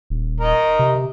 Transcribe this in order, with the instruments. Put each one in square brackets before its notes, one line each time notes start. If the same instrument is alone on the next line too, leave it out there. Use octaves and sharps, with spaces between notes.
[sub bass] D#1
[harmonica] A#4 D#5
[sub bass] C3
C3